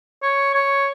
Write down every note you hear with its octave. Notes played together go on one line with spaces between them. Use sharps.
C#5
C#5